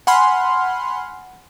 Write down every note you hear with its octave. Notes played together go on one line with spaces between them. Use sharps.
F#5 G#5 B5 C6 F6